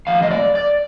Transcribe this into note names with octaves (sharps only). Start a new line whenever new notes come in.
A2 F3 F5
D#5
D5
D5